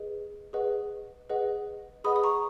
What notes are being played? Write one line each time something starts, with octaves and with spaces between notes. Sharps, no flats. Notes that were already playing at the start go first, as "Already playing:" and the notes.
Already playing: G#4 B4 D#5
G#4 B4 D#5 F#5
G#4 B4 D#5 F#5
G#4 B4 D#5 F#5 B5 D#6
D#6
A#5 C#6